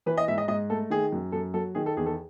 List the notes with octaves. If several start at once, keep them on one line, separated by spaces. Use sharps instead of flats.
E3 B4
D#5
G#2 E5
D#5
G#2 D#5
A3 A4
D#3 G#4
F#2
F#2 A4
F#3 A4
D#3 G#4
A4
E2 G#4
A4